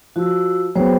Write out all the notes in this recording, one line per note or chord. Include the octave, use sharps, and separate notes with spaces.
F3 F#4 E6
F#3 B3 G#4 C5 G5